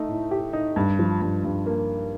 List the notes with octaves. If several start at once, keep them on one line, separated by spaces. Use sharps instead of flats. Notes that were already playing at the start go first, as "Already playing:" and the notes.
Already playing: A3 D#4
A2
G4
D#4
G2
F3
G2
G2
A#3